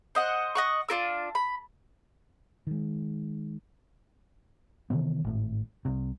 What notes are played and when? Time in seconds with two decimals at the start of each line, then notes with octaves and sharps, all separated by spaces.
0.15 C5 D#5 F#5
0.55 D#5 F#5 C#6
0.88 D4 F4 A#4 E6
1.35 B5
2.67 D#3 G#3
4.90 C3 D#3 E3 B3
5.24 G#1 A2
5.85 C2 C3